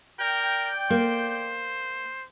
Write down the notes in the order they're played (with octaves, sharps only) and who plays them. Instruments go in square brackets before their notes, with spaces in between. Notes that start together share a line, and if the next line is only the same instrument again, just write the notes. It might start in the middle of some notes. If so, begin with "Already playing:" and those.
[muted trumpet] A#4 [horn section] D5 G5
[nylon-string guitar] A#3 [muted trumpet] C5